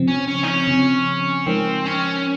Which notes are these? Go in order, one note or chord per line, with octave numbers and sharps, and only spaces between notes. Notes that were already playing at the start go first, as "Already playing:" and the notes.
Already playing: C#3 F3 C4
C#4
C#4
D#4
C#4
C#3 F3 C4
F3 G#3 C4 D#4 A#4
C#4